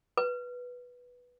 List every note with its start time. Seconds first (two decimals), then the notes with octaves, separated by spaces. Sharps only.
0.17 B4